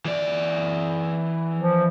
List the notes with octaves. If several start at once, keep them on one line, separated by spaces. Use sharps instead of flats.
E3 D5
F3